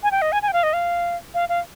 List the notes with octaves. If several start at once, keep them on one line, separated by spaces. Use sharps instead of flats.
G#5
G5
D#5
G#5
G#5
G5
F5
D#5
F5
F5
F5